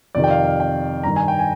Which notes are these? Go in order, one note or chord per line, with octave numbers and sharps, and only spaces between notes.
F2 C3 D#3 D5
G5
F5
F5
G5
G2 D#3 A#5
G#5
G5
G#5